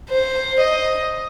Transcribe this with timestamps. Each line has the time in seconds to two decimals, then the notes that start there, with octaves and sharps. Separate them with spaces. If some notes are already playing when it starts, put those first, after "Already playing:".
0.10 C5
0.60 D#5